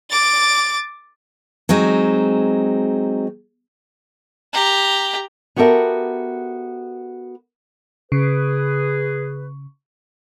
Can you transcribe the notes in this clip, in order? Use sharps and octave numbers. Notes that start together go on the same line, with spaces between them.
D6 A6
F#3 G#3 C4 D#4
G4 A#5
B3 F#4 G4 A4 A#4 E5
C#3 G#4 B4